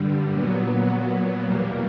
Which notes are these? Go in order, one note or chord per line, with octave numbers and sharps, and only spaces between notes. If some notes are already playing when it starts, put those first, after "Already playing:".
Already playing: G2 D3 G3
A#2 F#3 B3
E2 B2 G3 A#3